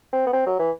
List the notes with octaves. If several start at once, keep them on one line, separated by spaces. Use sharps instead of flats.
C4
B3
C4
F#3
E3